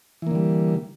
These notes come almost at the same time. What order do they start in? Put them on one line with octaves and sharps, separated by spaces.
E3 A#3 D3 G3